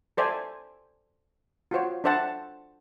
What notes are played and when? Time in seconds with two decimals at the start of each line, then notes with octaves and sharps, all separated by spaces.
0.17 A4 C5 D5 E5 G#5
1.71 F4 F#4 C5 C#5
2.04 D4 A4 C5 E5 F#5 A5